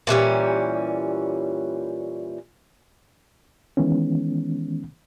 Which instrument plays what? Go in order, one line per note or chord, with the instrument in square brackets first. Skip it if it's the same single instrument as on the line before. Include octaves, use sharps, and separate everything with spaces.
[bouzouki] A#2 E3 G3 C#4
[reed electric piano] D#3 E3 G#3 B3 C#4